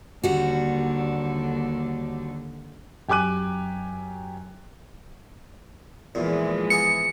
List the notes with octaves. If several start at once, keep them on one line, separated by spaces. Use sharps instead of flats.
D#2 D3 G3 F#4
F#2 G4 G#5 D6 F#6 D#7
E2 A#2 E3 F3 G#3
B3 G#4 C#7